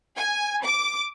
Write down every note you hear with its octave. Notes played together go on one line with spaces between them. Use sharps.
G#5
D6